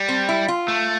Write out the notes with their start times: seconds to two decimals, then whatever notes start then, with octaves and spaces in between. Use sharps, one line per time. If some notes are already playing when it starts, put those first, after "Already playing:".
Already playing: G3
0.09 C4
0.29 E4
0.48 F4
0.68 A3